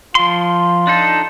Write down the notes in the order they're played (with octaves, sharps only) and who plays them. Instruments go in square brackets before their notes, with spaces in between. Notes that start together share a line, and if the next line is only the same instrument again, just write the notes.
[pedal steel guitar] F3 C6 [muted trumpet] F4
[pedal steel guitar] D4 D#4 A4